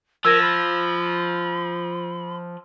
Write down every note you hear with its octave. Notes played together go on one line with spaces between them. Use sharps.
F3 A#4 E6 G#6 A#6
B5